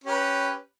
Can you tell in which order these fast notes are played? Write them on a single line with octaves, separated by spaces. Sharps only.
C#4 G4 B4